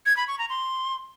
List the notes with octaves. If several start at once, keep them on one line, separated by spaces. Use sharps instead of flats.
G#6
B5
C#6
A#5
C6